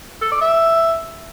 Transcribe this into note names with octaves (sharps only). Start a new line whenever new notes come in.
A4
D5
E5